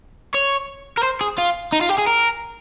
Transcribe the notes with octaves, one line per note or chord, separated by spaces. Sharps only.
C#5
A#4
C5
G#4
F4
D#4
F4
G4
G#4
A#4